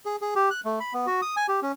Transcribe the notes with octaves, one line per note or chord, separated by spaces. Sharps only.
G#4
G#4
G4
F#6
A3
B5
B3
F#4
D#6
G#5
G4
C#4